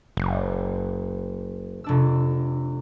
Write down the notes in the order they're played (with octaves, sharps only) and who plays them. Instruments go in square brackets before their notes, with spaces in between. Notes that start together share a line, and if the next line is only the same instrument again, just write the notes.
[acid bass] F#1
[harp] F1 D4 E6